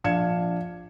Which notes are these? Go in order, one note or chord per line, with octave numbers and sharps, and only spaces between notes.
A#1 D4 F5 G#6 C#7 E7